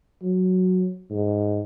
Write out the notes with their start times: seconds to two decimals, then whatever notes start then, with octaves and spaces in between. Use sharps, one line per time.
0.22 F#3
1.10 G#2